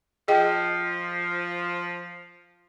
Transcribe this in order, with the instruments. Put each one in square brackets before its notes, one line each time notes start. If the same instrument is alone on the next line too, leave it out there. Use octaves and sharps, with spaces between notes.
[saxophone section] F3 [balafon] G#4 D#5 G5